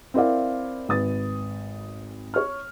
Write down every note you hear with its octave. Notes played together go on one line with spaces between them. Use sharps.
C4 E4 A#4 D5 F5
G#1 B4 D#6 A6
C#5 F6